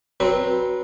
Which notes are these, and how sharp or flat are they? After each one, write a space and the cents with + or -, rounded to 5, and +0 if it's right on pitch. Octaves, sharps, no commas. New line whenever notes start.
F#3 +0 C4 +0 B4 -20